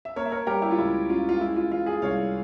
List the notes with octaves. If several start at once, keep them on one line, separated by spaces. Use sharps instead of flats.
E5
A#3 A#4 C#5
E5
A#4 C#5
G3 G4 A#4
E4 G4
F4
C#2 E4
C#3 F4
F4
G#3 E4
F4
E3 F4
F4 G#4
C2 C#5 F5